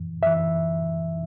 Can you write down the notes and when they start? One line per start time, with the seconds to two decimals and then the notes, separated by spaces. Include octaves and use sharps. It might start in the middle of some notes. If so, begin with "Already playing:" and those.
Already playing: F#2 E3
0.22 F#2 E3 E5